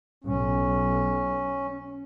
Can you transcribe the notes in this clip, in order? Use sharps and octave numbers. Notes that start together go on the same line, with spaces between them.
B1 C#4